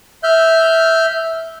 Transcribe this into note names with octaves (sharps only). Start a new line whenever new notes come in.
E5 F6 G6